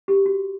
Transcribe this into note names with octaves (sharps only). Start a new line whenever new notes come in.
G4
F#4